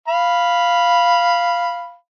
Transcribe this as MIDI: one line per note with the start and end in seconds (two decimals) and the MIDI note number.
0.08 1.94 77
0.08 1.94 83